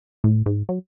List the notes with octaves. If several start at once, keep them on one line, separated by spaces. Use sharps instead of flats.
A2
G#2
F#3